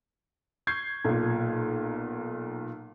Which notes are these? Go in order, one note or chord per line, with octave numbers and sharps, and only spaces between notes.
C#6 G6 G#6 C7
B1 A#2